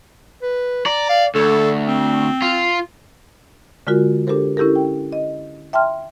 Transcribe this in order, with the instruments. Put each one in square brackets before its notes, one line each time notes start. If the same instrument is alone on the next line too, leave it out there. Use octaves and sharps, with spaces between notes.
[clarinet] B4
[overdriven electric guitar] D5 [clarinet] A#5
[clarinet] F5
[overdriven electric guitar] D2 [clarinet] A4
[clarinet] C4
[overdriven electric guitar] F4
[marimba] D3 G#3 F4 F#4 A#4
D4 G4 A4 A#4 C5
C#4 E4 G4 A4 A#4
G5
D#5
E5 G5 A5 C6 F6